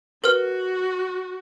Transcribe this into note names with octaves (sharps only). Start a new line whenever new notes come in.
F#4 A#4 B4 F6